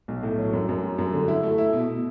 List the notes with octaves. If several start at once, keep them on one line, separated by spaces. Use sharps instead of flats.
B1
A2
F#3
F#2
F#2
G3
F#2
D3
E4
A3
E4
B2
B2